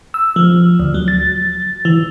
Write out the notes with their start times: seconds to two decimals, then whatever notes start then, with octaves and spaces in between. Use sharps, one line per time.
0.14 E6
0.36 F3
0.80 D2
0.94 F#3
1.08 A6
1.85 E3